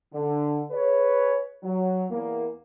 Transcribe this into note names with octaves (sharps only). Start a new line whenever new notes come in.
D3
G#4 B4 C#5
F#3
E2 A#3